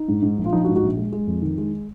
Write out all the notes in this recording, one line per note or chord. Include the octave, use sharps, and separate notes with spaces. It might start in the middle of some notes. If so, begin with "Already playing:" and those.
Already playing: D#4
G#2
G#2
A#1
F4
F3 D#4
D#4 F#4
G#2
D#4 F#4
A#1
G#3
G#3
F2
D#3
G#3